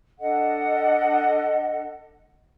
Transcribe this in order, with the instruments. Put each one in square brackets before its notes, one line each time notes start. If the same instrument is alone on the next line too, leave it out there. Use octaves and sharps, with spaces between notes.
[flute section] D4 A4 D#5 F#5